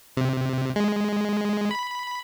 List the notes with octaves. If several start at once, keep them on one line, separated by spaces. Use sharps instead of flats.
C3
G#3
B5